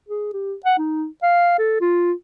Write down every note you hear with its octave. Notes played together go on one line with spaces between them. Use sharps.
G#4
G4
F#5
D#4
F5
A4
F4